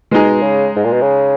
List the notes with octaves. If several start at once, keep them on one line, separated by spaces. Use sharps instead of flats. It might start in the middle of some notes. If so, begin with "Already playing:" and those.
B2 G#3 D#4 G#4
C#3
G#2
A#2
B2
C#3